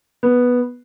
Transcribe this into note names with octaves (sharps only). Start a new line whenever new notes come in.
B3